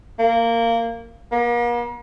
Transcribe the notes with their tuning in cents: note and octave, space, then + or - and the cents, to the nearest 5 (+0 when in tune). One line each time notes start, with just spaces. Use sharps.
A#3 -15
A#3 +45